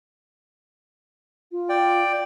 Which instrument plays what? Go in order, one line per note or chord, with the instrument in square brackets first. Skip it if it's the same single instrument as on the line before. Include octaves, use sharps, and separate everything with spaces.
[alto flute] F4
[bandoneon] D5 G5